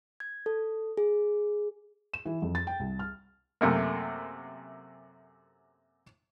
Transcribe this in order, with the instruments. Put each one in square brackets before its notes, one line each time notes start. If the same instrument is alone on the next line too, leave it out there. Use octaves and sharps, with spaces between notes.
[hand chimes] G#6
A4
G#4
[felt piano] E7
E3
F2
A6
G5
C2
F6
[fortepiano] F#2 C3 A3 A#3